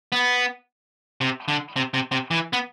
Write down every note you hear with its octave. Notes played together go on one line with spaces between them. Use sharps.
B3
C3
D3
C3
C3
C3
E3
B3